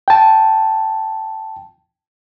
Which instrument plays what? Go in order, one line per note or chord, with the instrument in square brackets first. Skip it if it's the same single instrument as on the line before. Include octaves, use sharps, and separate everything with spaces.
[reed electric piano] G5 A5